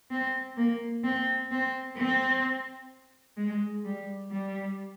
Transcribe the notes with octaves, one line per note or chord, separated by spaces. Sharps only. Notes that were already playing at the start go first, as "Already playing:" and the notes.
C4
A#3
C4
C4
C4
G#3
G3
G3